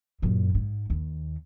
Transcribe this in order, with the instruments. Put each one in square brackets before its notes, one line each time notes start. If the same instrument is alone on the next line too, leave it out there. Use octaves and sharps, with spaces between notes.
[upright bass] F#2 A#2
G#2
D#2